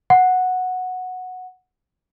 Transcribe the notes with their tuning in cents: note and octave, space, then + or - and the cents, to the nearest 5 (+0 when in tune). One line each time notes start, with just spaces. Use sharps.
F#5 -5